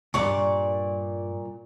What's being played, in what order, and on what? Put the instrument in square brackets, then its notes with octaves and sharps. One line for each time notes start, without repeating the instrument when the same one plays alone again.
[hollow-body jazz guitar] C#2 G2 [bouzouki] A#2 D5 [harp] C#6